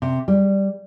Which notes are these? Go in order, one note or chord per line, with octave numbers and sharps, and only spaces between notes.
C3
G3